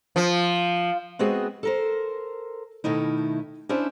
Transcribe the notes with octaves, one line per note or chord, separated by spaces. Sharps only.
F3
G#3 B3 C4 F#4 G#4
A4 A#4 C5
B2 D#3 A3 D#4 E4
C#4 D4 E4 C5 E5